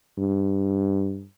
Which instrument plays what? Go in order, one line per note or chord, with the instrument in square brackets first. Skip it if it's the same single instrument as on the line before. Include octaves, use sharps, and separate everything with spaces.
[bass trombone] G2